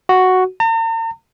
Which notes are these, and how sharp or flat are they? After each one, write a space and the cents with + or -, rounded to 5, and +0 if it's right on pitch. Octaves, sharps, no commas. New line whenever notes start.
F#4 +0
A#5 -45